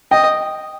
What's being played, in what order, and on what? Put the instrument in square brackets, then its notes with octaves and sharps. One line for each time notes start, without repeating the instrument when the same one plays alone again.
[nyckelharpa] D#5 [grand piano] G5